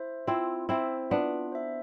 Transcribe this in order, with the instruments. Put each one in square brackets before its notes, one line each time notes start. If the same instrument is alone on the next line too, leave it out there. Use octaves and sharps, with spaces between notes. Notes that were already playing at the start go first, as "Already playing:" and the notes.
Already playing: [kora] E4 [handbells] C5 E5
[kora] C4 E4 [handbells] F4
[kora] C4 E4 [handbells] C5 E5
[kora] B3 D4 [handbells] F4
[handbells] C5 E5